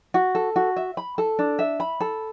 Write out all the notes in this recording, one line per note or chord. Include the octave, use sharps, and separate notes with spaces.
F#4
A4
F#4
E5
B5
A4
D4
E5
B5
A4